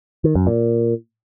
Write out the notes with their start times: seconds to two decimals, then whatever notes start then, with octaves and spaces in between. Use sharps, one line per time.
0.24 D#3
0.35 F#2
0.47 A#2